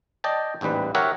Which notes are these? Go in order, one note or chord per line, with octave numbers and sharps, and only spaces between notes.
D5 D#5 G5 A5
A1 D#2 G#2 G3 B4
G4 A#4 C#5 E5 F#5